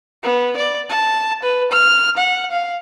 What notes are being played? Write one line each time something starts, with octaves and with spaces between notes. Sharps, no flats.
B3
D5
A5
B4
F6
F#5
F5